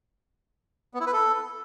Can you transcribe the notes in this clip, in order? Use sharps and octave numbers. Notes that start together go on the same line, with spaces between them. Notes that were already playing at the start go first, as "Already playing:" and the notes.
B3
E4
B4
A4